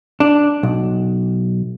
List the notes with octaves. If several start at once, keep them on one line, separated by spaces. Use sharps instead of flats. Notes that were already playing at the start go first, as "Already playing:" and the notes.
D4
B1